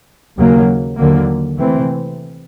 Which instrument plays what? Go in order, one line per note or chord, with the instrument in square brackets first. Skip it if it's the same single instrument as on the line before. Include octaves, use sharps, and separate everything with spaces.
[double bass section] D#2 C#3 F#3 A#3
D#2 D3 F#3 A#3
C3 E3 A3 C4